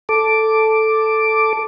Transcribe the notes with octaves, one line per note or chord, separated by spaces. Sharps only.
A4 D6